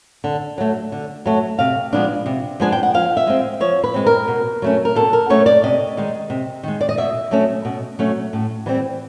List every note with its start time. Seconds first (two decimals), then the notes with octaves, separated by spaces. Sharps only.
0.24 D3
0.58 F#3 A3
0.92 D3
1.26 F#3 A3
1.59 C3 F5
1.93 F3 G#3 B3 D4
2.26 C3
2.60 F3 G#3 B3 D4 G#5
2.72 G5
2.83 F#5
2.94 F3 F5
3.17 E5
3.27 G#3 C4
3.60 F3 C#5
3.84 B4
3.94 G#3 C4
4.06 A#4
4.28 B2
4.62 F#3 A3 C#4
4.85 A#4
4.96 B2 A4
5.13 A#4
5.29 F#3 A3 C#4 C#5
5.46 D5
5.64 C3 D#5
5.97 D#3 G#3
6.30 C3
6.63 D#3 G#3
6.81 D5
6.89 D#5
6.97 B2 E5
7.31 F#3 A3 C#4
7.65 B2
7.99 F#3 A3 C#4
8.33 A2
8.66 E3 G3 C4